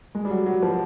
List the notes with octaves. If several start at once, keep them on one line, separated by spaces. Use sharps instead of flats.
G#3
G3
F#3
F#3
F3